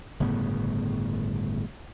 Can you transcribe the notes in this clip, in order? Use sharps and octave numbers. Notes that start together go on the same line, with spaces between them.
G1 A2 C#3 B3